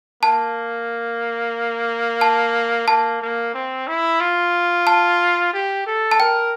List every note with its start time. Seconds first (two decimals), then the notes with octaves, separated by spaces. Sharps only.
0.23 A#3 A5
2.21 A5
2.88 A#3 A5
3.21 A#3
3.54 C4
3.87 E4
4.20 F4
4.87 A5
5.53 G4
5.86 A4
6.11 A5
6.20 A#4 G5